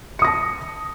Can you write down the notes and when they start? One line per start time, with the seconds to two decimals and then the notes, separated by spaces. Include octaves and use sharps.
0.19 C#7
0.22 D#6
0.25 A#6
0.27 A5